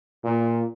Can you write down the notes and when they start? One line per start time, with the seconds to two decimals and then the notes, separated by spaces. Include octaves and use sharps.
0.24 A#2